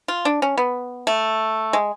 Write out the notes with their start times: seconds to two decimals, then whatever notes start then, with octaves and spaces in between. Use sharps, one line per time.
0.08 F4
0.25 D4
0.42 C#4
0.58 B3
1.07 A3
1.73 G#3